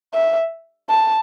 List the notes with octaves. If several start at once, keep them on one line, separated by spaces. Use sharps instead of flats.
E5
A5